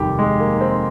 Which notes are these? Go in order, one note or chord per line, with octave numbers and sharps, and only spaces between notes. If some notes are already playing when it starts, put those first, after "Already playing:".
Already playing: F1 D#2 D#3 G3 G4
G#3
A#3
C4